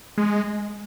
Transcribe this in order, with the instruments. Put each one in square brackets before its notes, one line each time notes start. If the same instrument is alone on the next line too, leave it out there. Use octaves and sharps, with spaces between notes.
[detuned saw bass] G#3